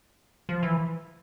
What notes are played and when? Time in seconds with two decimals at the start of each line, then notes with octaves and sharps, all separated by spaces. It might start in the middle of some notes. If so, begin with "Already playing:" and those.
0.49 F3
0.63 E3